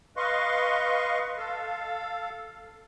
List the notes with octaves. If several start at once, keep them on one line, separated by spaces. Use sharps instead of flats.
B4 D#5 F5 C6 C#6
A4 F5